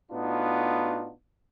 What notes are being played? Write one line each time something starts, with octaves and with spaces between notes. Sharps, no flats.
A2 B3 D4 D#4 F4 F#4